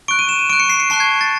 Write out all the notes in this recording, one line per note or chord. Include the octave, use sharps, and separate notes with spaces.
C#6 F#6 D7
D#7
E7
D#7
C#6 F#6 D7
C#7
C7
C#7
A5 C#6 F#6 C7
G#6
A6